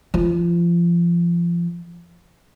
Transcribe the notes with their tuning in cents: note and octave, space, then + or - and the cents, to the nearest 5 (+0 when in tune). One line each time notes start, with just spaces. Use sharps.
F3 -30